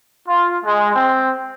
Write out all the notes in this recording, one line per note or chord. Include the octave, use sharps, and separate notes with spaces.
F4
G#3
C4